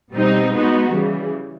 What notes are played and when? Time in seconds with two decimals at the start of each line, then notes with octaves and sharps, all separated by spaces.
0.12 B2 G3 C4 D#4
0.52 G#3 B3 D#4 F#4
0.92 C#3 E3 G3